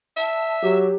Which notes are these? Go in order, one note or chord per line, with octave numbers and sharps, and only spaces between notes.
E5 A5
F#3 G4